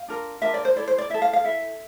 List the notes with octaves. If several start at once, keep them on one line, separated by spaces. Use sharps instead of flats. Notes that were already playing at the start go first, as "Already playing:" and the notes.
Already playing: F5
D4 F4 A#4
D4 F4 A#4 E5
D5
C5
E4 A4 D5
C5
D5
E4 A4 E5
F5
F5
E4 A4 E5